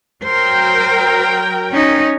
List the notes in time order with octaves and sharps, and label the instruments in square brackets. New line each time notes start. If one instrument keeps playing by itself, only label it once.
[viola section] F#3 A#4 G5 [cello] C5
[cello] C#4 D#4